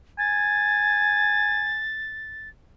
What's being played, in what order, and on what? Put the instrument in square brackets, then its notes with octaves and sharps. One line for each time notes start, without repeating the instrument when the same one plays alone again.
[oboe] G#5 [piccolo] A6